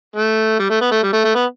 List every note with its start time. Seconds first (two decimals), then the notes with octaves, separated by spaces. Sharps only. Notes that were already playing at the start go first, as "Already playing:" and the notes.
0.16 A3
0.59 G3
0.70 A3
0.81 B3
0.91 A3
1.03 G3
1.13 A3
1.24 A3
1.35 B3